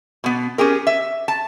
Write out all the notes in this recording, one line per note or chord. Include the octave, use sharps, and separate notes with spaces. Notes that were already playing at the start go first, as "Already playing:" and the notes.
B2 B3
C#4 G4 G#4 A#4
E5
A5